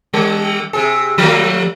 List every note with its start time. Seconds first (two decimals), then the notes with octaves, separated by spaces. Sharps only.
0.13 G3
0.73 C3 G#4
1.18 F3 G3 A3